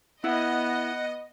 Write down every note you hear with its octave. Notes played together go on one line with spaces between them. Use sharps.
B3 E4 D#5 F#5